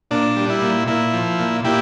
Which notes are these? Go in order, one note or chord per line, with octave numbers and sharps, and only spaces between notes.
A#2 D4
G3
E4
A#2
A#2 E4
F3
A#2
A#2 E4 G4